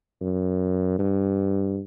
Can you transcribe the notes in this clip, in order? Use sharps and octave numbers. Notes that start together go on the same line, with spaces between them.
F#2
G2